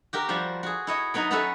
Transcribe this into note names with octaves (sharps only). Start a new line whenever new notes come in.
F#4 G4 A#4
F3 G3 F#4 C5
F#4 G#4
E4 C#5 D#5
F#3 B3 D#4 F#4
B3 C#4 F#4 A4 B4 E5